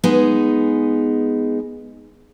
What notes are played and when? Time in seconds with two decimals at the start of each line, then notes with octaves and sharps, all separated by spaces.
0.04 G#3 B3 D#4 G#4